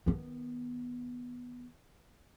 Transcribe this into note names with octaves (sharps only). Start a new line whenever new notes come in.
D#3 B3